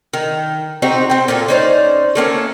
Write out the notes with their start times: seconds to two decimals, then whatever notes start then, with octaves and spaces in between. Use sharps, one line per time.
0.13 D#3
0.82 C4 D#4 F#4 G4
1.10 C4 G5
1.28 A#2 F4 A4
1.48 C#4 D#4 C5 D5
2.15 A3 A#3 C4 C#4